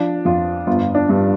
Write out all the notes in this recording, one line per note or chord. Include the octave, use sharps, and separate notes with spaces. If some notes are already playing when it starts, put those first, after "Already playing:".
Already playing: F3 D4
F2 F4
G1 F4
D4
G2